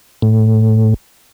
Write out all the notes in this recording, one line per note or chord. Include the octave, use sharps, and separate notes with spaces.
A2